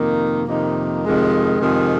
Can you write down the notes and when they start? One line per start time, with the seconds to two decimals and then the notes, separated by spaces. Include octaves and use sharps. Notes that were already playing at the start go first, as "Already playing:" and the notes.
Already playing: F2 C3 D#3 A#3 D#4
0.47 F2 C3 D#3 A#3 D#4
1.04 F2 C3 D#3 G#3
1.60 F2 C3 D#3 G#3